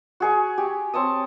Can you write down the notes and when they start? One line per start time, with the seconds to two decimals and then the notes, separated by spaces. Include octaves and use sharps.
0.20 F#4 G#4 C#6
0.58 G4
0.93 C4 C#5 A5 D#6